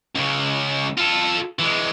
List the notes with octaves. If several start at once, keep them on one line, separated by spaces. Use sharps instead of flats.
C#2 C#3
F4 A4
E3 G#3